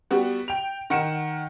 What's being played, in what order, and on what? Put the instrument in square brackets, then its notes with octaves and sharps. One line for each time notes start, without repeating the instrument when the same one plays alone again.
[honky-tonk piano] G3 B3 F#4
G5 F7
D#3 F#5 C#7 E7